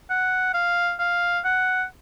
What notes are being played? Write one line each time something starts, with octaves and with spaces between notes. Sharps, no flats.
F#5
F5
F5
F#5